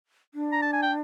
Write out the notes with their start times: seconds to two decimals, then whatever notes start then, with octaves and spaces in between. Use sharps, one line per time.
0.34 D4
0.52 A#5
0.62 A5
0.73 G#5
0.83 G5